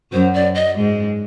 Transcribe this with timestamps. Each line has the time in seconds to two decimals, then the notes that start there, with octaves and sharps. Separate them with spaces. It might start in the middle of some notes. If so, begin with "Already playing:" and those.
0.12 F#2 F#3 C5
0.34 D5
0.55 D#5
0.76 G#2 G#3